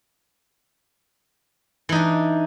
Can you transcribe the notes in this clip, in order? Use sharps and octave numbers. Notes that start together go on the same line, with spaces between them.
E3 D4 D#4